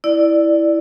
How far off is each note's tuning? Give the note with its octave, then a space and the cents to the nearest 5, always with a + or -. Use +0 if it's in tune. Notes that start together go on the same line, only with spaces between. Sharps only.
E4 +0 D5 +5